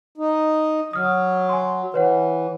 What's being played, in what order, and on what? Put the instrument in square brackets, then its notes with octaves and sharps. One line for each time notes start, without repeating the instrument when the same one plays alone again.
[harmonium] D#4
[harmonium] F#3 [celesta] D#6 F6
[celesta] G#5 C6
[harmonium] E3 [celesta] B4 C#5 F#5